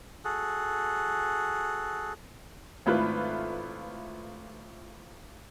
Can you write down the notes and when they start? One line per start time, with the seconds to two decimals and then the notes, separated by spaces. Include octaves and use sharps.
0.25 F#4 G#4 A4
2.86 G#1 A3 E4 F4 B4 F#6